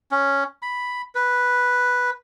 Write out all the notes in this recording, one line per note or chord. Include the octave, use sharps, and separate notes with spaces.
C#4
B5
B4